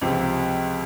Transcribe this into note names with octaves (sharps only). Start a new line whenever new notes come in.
C#2 C3 F3